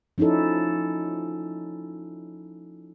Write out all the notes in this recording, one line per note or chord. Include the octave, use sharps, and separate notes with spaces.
F3 C#4 D#4 E4 A4